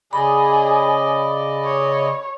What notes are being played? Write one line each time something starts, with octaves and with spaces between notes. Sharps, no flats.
C#3 G#4 D5 D#5 B5
C#5